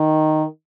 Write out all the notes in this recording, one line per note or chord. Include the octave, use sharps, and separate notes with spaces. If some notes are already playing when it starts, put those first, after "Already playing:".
Already playing: D#3